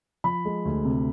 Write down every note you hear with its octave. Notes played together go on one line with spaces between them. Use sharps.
F3 B5
G#3
D2
C3